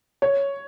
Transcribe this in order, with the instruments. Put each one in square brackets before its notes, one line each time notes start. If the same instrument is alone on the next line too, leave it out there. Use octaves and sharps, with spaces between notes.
[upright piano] C#5